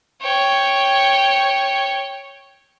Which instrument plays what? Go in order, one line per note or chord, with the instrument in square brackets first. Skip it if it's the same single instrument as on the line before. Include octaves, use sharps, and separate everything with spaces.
[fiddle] C#5 G5